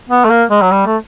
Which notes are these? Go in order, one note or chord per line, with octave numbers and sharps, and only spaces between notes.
B3
A3
A#3
G#3
F#3
G3
A3